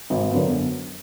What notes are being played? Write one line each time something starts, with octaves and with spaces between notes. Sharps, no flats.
G#1
F#2 D3 F#3 B3